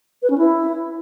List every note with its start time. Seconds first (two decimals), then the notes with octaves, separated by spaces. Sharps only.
0.22 B4
0.30 C#4
0.38 E4